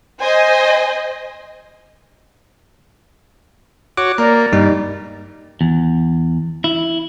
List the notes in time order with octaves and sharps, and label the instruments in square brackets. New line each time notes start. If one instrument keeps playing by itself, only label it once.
[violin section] C5 D#5 G#5
[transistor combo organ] F#4 C#5 [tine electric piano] D6
[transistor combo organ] A#3 [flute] D5 [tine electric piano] A#5
[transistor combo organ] G2 [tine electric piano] G3 D#4
[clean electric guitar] E2
E4